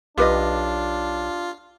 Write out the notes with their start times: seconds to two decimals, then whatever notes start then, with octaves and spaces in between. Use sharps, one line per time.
0.17 B1 D4 F4 G4 B4 D#5